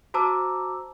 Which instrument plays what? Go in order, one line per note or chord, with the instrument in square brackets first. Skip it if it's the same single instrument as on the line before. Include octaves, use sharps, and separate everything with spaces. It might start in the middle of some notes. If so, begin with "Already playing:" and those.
[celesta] F#4 C5 A5 A#5 D6 E6